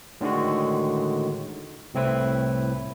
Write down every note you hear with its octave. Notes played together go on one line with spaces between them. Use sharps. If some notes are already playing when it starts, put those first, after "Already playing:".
A2 D3 D#3 G#3 F#4
C2 A2 C4 E4 B4